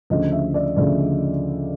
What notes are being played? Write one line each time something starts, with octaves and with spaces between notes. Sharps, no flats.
D2 C#3 F3 D#5
E5
D5
D2 C#3 F3 D5